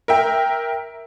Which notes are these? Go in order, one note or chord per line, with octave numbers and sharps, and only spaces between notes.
A#4 E5 G5